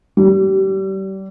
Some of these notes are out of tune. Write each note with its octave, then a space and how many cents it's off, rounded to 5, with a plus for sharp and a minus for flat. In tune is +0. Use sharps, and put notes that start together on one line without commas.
G3 -30